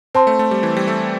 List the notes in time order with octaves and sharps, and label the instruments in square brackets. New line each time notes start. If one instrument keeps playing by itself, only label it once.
[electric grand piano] C4 [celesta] C5 A5 C6
[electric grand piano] A3
A3
G3
E3
G3
A3